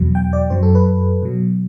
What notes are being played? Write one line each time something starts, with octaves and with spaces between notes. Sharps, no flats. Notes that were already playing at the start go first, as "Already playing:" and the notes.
Already playing: E2 B2 F#3
G5
D5
F#2 F#3 C5
A4
B4
B2 F#3